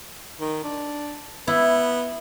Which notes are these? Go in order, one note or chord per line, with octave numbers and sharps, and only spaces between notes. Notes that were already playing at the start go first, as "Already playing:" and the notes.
D#3
D4
B3 E4